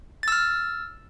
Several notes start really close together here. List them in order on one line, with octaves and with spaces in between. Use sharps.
A6 E6 F6